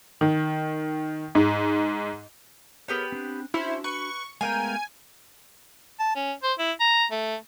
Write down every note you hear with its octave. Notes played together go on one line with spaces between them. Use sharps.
D#3
G#2
B3 G4 G#4 A#4 B4 C#5
C4 D4
C#4 D4 E4 F#4 C5
B4 C#6
G#3 A3 B3 F4 A#4 G5 G#5
A5
C#4
C5
E4
A#5
A3